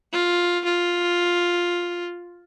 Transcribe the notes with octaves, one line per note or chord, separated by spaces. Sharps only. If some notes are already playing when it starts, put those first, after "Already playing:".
F4
F4